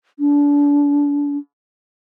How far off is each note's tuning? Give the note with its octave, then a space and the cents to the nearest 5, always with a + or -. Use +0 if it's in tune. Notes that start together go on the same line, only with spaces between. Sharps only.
D4 -30